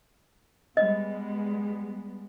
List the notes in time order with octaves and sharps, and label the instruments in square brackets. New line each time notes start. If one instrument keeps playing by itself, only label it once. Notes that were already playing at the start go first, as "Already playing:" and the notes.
[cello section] G3 G#3 B3 [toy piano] D#5